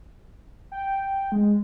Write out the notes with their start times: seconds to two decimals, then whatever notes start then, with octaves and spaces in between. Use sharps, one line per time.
0.72 G5
1.32 G#3